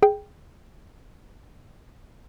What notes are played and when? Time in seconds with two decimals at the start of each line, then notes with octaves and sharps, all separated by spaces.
0.03 G#4 G5